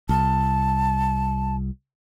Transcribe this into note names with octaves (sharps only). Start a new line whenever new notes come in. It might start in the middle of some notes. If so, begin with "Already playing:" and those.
C2 A5